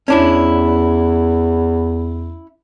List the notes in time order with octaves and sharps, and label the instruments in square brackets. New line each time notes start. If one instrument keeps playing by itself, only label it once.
[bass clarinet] E2 [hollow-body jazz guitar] C#4 D4 E4